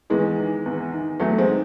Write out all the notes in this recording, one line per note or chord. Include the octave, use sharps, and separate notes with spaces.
E2 E3 G#3
D#3
E2
D#3
E2 F#3 A3
G#3 C4
D#3